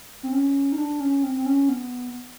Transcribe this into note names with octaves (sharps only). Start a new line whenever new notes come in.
C4
C#4
D#4
D4
C#4
C4
C4
C#4
B3